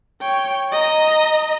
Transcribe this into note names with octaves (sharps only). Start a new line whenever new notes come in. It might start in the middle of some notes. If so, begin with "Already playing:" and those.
C#5 G5
D#5 A#5